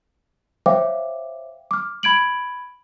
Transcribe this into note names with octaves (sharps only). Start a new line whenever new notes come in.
C5 C#5 E5 F5 G5 D6
D6 F6
B5 G#6 D7 F#7